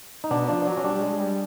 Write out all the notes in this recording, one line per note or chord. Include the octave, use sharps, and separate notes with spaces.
D#4
B2 D4
F3 D4
F#3
C#4
G3 D4
G#3
G3